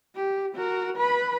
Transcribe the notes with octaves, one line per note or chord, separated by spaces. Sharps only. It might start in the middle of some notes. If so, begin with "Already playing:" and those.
G4
F#4 A#4
B4 B5